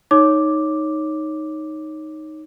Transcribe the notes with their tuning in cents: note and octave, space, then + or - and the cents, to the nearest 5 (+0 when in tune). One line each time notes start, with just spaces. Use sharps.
D#4 +0 C#5 +0 D6 +0